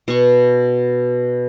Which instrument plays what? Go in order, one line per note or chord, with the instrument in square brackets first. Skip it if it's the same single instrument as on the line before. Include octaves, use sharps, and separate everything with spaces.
[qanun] B2 C#6